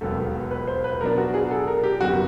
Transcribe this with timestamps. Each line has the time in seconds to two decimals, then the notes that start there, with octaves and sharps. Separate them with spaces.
0.01 E1 D#2 D#3 F#3 B3 A4
0.51 B4
0.67 C5
0.84 B4
1.01 B2 F#3 B3 D4 A#4
1.18 F#4
1.34 G#4
1.51 A4
1.68 A#4
1.83 G4
2.00 F#1 F#2 D#3 F#3 B3 F#4